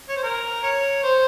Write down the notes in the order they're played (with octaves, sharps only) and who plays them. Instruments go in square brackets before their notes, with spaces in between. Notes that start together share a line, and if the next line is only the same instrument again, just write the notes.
[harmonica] C#5
C5
A#4
C#5
C5